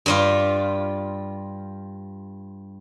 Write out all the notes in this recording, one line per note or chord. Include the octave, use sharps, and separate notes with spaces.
G2 G3 F4